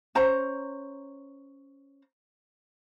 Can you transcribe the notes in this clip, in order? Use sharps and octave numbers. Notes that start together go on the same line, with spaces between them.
C#4 C5 A#5